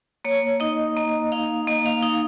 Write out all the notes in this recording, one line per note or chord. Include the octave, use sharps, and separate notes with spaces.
A#3 C#5
D#4 D#5
A#3 D#5
D#4 F5
A#3 D#5
F5
D#4 F5